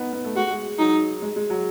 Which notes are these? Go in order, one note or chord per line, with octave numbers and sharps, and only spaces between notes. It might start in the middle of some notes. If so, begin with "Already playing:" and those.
Already playing: B3 D#4
B3
A3
G#3 F#4
G#3
F#3 D#4
G#3
G#3
F#3